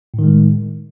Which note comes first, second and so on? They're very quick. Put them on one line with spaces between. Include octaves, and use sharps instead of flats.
A2 D#3 G#3